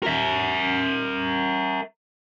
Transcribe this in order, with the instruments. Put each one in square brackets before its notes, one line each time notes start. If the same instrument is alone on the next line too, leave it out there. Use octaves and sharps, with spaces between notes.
[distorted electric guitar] A#4 E5